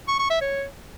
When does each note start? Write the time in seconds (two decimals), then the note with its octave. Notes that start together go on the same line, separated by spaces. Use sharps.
0.08 C#6
0.19 C#6
0.30 E5
0.41 C#5